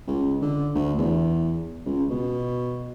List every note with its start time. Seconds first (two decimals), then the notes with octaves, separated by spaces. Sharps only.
0.07 C#2
0.42 D3
0.75 D2
0.98 E2
1.86 C#2
2.10 B2